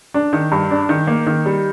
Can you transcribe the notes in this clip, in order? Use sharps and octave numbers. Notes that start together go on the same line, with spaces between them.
D4
D#3
G2
D4
D#3
A#3
D#3
G3